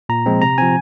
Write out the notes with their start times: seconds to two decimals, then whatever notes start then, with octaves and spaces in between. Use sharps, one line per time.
0.09 A#2 A#5
0.26 F3 G#3 C4
0.42 C3 A#5
0.58 F3 C4 G#5